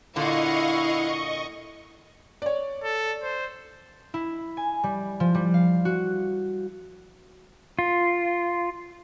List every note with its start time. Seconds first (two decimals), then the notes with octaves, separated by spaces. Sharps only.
0.16 A#2 D3 E4 D#5 F5 F#5 C#6
2.42 C#5 D5
2.84 A4
3.23 C5
4.14 E4
4.57 G#5
4.84 G3
5.20 F3
5.35 G3
5.54 F5
5.85 F#4
7.79 F4